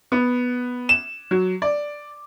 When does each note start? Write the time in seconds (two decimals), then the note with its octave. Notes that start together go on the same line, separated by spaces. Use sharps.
0.12 B3
0.89 E7
1.31 F#3
1.62 D5